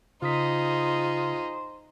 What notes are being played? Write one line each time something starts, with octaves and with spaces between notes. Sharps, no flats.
C#3 D#4 F4 G#4 C5 D#6 B6